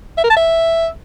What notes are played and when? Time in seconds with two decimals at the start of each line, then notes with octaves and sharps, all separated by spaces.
0.18 E5
0.24 A#4
0.30 A5
0.36 E5